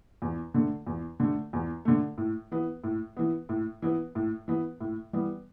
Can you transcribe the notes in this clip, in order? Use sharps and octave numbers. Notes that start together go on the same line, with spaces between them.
E2
D3 A3
E2
D3 A3
E2
D3 A3
A2
E3 B3
A2
E3 B3
A2
E3 B3
A2
E3 B3
A2
E3 G3 B3